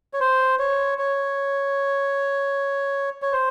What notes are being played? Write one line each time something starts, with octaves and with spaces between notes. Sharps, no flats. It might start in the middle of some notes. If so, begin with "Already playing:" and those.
C#5
C5
C#5
C#5
C#5
C5